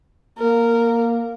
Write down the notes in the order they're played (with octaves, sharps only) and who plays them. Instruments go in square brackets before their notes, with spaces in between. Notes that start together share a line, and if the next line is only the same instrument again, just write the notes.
[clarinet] A#3 [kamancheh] A#4